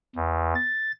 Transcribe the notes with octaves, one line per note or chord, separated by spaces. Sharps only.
E2
A6